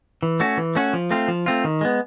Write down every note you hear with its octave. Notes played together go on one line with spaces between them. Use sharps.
E3
A3 C#4 F#4
E3
A3 C#4 F#4
F3
A3 C4 F4
F3
A3 C4 F4
D#3
G#3 B3